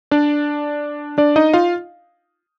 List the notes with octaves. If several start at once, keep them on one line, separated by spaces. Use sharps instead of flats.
D4 D5
D4 D5
D#4 D#5
F4 F5